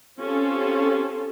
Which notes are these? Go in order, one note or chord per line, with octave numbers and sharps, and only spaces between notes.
C4 C#4 F4 G4 A4